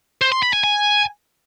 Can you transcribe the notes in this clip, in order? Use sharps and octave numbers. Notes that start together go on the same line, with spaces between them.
C5
C6
B5
G#5
G#5